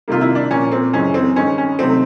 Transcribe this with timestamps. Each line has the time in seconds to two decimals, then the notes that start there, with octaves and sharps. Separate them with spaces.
0.08 C3 D#3 G3 A#3 F4
0.21 E4
0.35 D4
0.51 A#2 F3 A#3 C#4
0.71 C4
0.93 F#2 C#3 E3 G#3 C#4
1.14 C4
1.36 G2 D#3 G#3 C#4
1.58 C#4
1.79 C3 D#3 F#3 A3 C4